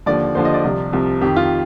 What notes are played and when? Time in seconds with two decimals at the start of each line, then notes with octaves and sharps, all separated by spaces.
0.06 D#2 D3 F3 D5
0.35 D#2 D3 F3 C5
0.45 D#5
0.54 D5
0.64 C2 C3 F3
0.93 C2 C3 F3
1.21 F2 D#3 G4
1.36 F4